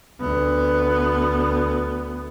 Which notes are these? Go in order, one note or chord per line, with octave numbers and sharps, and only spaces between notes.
D2 B3